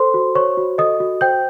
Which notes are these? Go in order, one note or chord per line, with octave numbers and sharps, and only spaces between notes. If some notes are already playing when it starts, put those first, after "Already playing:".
Already playing: A4 C5 C6
F#4
C5 C#5 C#6
F#4
A4 D#5 D#6
F#4
C5 G5 G6